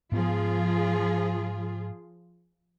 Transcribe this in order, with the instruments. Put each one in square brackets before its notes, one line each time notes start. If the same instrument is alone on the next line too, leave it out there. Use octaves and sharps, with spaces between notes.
[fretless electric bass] G#2 B3 [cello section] F3 F4 G#4